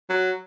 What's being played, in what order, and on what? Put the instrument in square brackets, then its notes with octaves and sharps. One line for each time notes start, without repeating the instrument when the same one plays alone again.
[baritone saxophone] F#3